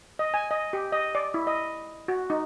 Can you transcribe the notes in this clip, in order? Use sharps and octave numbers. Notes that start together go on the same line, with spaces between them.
D#5
G#5
D#5
G4
D#5
D5
E4
D#5
F#4
D#4